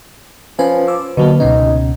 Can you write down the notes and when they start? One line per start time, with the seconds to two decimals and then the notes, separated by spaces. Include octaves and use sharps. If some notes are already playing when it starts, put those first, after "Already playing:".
0.59 F3 C#4 B4 G#5
0.88 D6 E6
1.17 B2 D3 F#3 A#3
1.40 C#2 B2 C#4 D#4